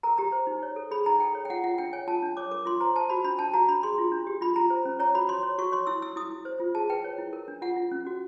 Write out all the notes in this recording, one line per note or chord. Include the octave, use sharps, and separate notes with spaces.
A#4 A#5
G4 A#5
C5
D#4
C#5
A4
G#4 B5
D#4 A#5
A4 G5
C#5
G5
F4 F#5
F4 F#5
D4 G5
C#5 G#5
F4 A5
D4
C#5 D6
A#4 D6
F4 C6
C5 A#5
C5 A5
F#4 B5
D4 B5
D4 A5
F#4 A#5
D4 B5
G#4 C6
F4
D4
G4
F4 B5
F4 A#5
C5
C#4
C#5 A#5
F#4 B5
C#5 C6
C#5
F#4 C#6
C#5 C6
E4 E6
E4 E6
E4 D#6
E4
C5
F4
G#4 A5
B4 G5
C#5
E4
A#4
D4
F4 F#5
F4
C#4
F#4